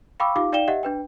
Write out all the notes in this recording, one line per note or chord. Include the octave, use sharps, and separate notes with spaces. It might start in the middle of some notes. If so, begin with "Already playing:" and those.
F5 G5 B5 C#6 D6 E6
D#4 F4 G4 F5 D6
D#4 D5 F5 G5 E7 G7
G4 D#5 E5 F#5
D4 B4 G5